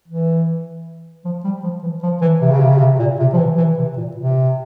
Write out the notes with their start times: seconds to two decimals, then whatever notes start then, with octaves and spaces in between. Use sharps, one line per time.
0.08 E3
1.25 F3
1.44 G3
1.63 F3
1.82 E3
2.03 F3
2.21 E3
2.41 C3
2.51 C#3
2.60 C3
2.69 C#3
2.78 C3
2.99 A#2
3.19 C3
3.33 F3
3.38 E3
3.58 E3
3.78 C3
3.97 A#2
4.16 C3